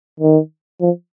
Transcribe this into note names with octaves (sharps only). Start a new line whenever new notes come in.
D#3
F3